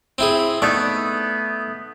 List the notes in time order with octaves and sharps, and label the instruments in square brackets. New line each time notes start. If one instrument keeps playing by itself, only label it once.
[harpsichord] C4 E4 G#4
[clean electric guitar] A3 B3 D#4 [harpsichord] D5